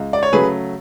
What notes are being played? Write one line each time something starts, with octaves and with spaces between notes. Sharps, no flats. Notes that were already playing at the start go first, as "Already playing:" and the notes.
Already playing: C#2
D5
C#5
C#3 F#3 A3 G#4 B4